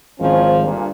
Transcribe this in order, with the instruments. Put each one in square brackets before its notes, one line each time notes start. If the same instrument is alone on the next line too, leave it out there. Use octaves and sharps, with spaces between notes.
[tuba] G#1 [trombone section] E2 D#3 C#4 [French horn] F3
[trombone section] D2 G2 A#2